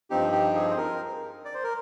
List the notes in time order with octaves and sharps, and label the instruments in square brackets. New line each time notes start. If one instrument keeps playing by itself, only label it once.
[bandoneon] G2 F3 C4 D#4 G4
G4
G#4
C5
A#4
D5
C5
A#4